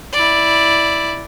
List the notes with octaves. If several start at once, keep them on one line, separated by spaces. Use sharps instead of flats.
E4 D5